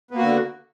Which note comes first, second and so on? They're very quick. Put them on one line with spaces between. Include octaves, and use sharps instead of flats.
B3 A#3 F#4 D3